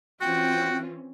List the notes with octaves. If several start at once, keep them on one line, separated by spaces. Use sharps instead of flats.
E3 C4 C#4 F4 F#4 G5